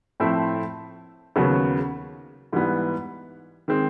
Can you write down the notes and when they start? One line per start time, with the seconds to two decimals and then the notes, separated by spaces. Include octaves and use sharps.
0.20 A2 F3 A3 C4 E4
1.36 D#2 C#3 F#3 B3
2.53 G#2 E3 G3 B3
3.68 D#3 G#3 C4